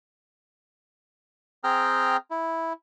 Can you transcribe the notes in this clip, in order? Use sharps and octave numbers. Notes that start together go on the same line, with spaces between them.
C4 G#4 G5 A#5 F6
E4